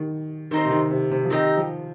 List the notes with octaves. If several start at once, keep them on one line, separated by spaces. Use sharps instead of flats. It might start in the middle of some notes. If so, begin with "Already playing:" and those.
Already playing: D#3
D#3 C4 D#4 C5
C3
D#3
C3
C3
F3
D#3 C4 D#4 G4 D#5
F3